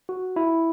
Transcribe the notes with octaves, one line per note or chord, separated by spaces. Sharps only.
F#4
E4